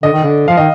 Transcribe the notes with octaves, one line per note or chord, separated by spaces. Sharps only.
D3 D#5
D#3
D3
F3 F5
D#3 D#5